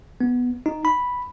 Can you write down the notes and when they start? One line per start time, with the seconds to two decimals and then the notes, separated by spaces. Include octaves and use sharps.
0.21 B3
0.66 D#4
0.85 B5